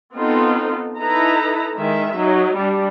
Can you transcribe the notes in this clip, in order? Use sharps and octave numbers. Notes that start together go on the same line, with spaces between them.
B3 C4 D#4 F4 A4
D#4 E4 A4 B4 A#5
D#3 G#3 E5
F#3 D#4
G3 D4